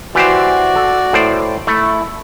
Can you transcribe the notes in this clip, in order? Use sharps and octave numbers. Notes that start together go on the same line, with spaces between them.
E3 F#4 G4 C5 D5
A4
A2 C5 D5
A3 E4